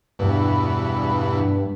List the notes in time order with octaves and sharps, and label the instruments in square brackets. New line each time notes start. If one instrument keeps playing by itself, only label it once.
[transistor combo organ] E2 B2 [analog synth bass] G2